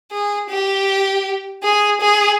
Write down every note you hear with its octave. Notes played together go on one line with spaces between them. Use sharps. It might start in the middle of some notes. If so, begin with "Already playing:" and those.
G#4
G4
G#4
G#4